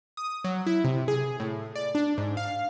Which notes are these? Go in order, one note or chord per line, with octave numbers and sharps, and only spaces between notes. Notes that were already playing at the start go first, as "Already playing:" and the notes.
D#6
F#3
E4
C3
G#4
A2
D5
D4
G#2
F5